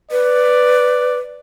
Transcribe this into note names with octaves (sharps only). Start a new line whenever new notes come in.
B4 D5